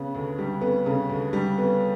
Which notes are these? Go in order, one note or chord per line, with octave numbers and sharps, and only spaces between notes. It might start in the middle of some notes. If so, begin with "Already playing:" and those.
Already playing: C#3 B3
D2
G3
B3
C#3
D2
G3
B3